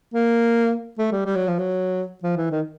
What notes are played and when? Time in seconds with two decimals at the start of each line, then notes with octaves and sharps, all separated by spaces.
0.14 A#3
0.98 A3
1.12 G3
1.26 G3
1.36 F#3
1.48 F3
1.59 F#3
2.23 F3
2.37 E3
2.51 D#3